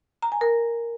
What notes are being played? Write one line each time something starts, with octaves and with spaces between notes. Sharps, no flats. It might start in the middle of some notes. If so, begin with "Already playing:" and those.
A#5
G#5
A#4